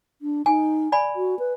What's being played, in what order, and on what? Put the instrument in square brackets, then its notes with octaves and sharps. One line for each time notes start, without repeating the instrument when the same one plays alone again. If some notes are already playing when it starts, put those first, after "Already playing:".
[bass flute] D4
[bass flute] D#4 [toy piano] G#5
[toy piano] D5 G#5 B5
[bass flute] F#4
B4